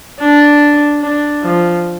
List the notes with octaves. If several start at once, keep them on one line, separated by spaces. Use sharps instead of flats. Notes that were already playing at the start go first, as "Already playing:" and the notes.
D4
D4
F3